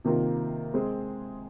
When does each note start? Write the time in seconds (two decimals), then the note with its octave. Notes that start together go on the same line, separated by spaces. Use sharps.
0.04 C3 D#3 A#3 F4 A#4
0.74 G#3 C4 G#4